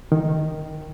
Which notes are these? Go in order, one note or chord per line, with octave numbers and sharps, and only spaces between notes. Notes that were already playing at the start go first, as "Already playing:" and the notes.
D#3